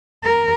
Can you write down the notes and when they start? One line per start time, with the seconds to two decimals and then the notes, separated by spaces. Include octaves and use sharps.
0.24 A#4